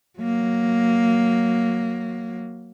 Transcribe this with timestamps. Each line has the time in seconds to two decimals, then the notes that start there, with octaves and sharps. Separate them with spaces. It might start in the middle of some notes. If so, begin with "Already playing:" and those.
0.19 F#3 A#3